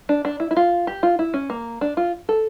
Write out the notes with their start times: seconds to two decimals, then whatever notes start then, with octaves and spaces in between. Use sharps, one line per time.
0.09 D4
0.25 D4
0.40 E4
0.51 E4
0.56 F4
0.87 G4
1.03 F4
1.19 E4
1.34 C#4
1.50 A#3
1.81 D4
1.97 F4
2.29 A4